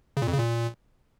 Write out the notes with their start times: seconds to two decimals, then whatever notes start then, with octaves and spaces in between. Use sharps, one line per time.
0.17 C#3
0.22 A#2
0.27 F2
0.33 C#3
0.38 A#2